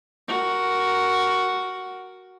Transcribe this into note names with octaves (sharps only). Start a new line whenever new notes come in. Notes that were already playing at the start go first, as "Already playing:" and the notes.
F#4 A#4